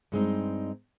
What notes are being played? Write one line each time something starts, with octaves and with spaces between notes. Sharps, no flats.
G2 G#3 C4 D#4